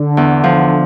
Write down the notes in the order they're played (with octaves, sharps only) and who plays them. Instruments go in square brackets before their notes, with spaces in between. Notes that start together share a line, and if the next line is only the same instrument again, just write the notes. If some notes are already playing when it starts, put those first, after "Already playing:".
Already playing: [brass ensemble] D3
[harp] E2
F3